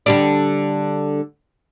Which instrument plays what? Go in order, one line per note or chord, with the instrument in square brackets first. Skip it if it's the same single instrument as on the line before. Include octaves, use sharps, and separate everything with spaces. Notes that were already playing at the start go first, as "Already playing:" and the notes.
[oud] D3 G3 D4